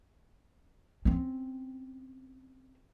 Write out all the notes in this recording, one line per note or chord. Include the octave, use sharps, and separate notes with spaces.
C4 C#4